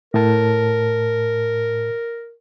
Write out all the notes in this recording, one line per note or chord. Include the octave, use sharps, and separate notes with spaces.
A2 A#4 A5